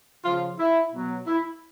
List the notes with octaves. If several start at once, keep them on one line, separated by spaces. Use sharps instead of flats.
C#3 F3 F4
E4
B2 F#3
E4